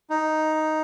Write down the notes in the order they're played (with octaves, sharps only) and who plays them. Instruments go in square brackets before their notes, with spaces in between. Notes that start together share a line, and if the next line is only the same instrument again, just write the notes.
[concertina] D#4